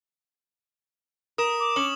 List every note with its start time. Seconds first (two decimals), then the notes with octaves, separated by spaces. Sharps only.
1.38 A#4 D#6 E7
1.60 D6
1.76 C#4 F#7